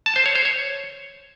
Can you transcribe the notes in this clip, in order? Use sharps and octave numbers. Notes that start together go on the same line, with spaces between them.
A5
C5
C#5
C5
C#5